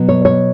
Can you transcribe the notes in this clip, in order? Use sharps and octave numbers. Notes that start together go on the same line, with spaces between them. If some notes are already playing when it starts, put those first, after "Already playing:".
Already playing: B2 F#3
C#5
C#5